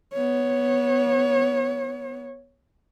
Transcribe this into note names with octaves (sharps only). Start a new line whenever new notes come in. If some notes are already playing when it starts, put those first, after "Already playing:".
B3 C#5